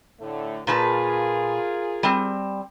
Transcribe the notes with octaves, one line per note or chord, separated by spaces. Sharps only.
A2 D3 A3
A#2 F4 G#4 A#4 B4 A5
G3 C4